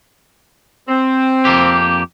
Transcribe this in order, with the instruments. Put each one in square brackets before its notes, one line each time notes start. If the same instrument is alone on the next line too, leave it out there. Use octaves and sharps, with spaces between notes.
[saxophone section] C4
[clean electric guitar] F2 A#3 G4